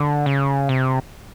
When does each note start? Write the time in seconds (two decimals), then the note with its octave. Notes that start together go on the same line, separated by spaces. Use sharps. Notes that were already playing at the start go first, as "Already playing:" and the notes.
Already playing: D3
0.26 C#3
0.69 C3